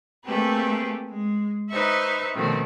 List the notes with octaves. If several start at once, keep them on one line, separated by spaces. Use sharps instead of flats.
A3 A#3 C4 G4 G#4 B4
G#3
D#4 B4 C5 E5 C#6
B2 D#3 F3 A3 C4 C#4